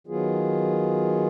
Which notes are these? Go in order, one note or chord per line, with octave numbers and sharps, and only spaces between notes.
D#3 F#3 B3 F4 G#4